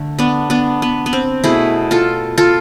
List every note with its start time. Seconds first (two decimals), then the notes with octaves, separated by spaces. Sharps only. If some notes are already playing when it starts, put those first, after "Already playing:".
Already playing: D3 A3
0.19 B3 D4
0.50 B3 D4
0.82 B3
1.06 B3
1.13 C4
1.43 B2 A3 E4 G#4
1.91 F4 A4
2.38 F4 A4